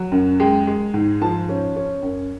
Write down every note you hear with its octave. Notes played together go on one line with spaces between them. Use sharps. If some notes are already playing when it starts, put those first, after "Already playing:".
Already playing: F#3
F#2
G#3 G5
G#3
G#2
F3 A5
C#4
C#4
F#2